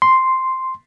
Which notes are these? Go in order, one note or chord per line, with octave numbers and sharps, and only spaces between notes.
C6